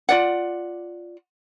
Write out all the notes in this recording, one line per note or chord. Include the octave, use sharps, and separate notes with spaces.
F4 D5 F#5